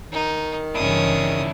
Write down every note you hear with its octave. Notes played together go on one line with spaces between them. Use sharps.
D#3 D#4
G1 C#3 E3 C#4 D4 E4 D#6